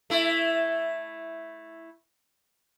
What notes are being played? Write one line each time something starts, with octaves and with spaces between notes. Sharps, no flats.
A3 E4